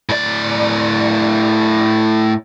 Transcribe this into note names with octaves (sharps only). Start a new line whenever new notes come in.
A2 D5